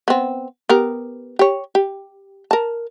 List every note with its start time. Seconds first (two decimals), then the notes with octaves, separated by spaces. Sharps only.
0.08 B3 C4
0.69 B3 G4 A#4
1.39 G4 C#5
1.75 G4
2.51 A#4 A5